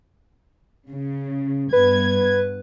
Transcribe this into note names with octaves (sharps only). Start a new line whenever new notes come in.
C#3
G2 B3 B4 G#6